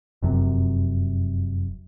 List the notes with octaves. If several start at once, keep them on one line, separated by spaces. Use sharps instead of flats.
F1 F#2 C3